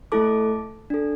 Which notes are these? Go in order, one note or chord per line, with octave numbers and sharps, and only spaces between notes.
A3 E4 A4 A5 D6
D4 A4